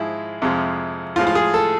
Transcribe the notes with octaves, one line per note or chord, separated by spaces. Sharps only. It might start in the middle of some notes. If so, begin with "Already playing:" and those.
Already playing: G#2 F3 G#3 E4
F2 C3 F3 G#3
A2 F3 G#3 F4
F4
G#4
A4